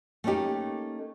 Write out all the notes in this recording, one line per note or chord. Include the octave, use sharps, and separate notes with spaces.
A3 A#3 C#4 D#4 G4